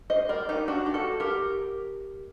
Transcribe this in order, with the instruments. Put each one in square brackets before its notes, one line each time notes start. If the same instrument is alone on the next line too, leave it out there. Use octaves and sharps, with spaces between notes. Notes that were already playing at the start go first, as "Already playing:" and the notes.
[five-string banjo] C5 D#5
A#4 D5
D#4 G4
D4 F#4
G4
F#4 A4
G4 A#4